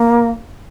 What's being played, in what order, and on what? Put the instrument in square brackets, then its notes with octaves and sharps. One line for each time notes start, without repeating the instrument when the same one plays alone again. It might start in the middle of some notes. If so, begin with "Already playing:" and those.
Already playing: [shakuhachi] A#3